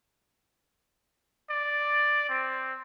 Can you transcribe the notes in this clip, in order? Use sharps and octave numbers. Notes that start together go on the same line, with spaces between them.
D5
C4